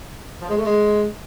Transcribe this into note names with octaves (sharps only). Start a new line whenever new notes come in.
F3
G#3
A3
G#3